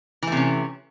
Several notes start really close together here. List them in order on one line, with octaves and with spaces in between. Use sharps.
E3 A3 C3 C#4